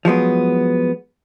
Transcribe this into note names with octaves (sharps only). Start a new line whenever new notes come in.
F3 F#3 G#3 B3